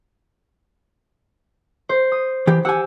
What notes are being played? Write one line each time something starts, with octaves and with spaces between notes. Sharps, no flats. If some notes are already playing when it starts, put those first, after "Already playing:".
C5
D#6
E3 G4
G4 F#5 G#5 E6